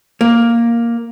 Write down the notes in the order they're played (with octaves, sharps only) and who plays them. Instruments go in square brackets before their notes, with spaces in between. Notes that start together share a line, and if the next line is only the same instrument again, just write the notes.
[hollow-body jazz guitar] A#3